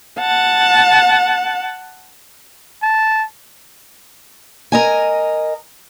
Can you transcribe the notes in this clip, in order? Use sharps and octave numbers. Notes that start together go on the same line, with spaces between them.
F#5 A5
A5
A#4 D#5 G#5